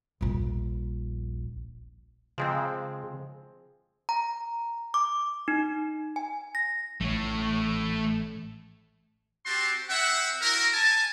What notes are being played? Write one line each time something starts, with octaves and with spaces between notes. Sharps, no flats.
D#1 A#1
C#3 F3 G#3 C4
A#5
D6
D#4
G#5
A#6
A1 A3 C#5
C4 F#4 G4 A5 C6
C4 E5 F#5
E4 F#4 A#4
G#5 A5